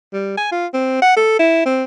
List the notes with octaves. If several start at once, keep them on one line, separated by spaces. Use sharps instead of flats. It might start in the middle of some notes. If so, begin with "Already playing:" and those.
G3
G#5
F4
C4
F#5
A4
E4
C4